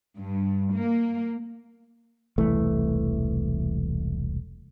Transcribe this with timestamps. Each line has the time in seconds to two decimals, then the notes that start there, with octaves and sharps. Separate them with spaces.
0.17 G2
0.74 A#3
2.38 E1 C2 E3 A3